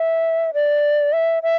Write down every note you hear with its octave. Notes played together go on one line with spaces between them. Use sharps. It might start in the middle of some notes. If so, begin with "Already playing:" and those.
Already playing: E5
D5
E5
E5